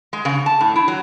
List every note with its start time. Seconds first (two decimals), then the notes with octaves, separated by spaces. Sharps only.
0.13 G#3
0.25 C#3
0.46 A5
0.61 A2
0.76 E4
0.88 F#3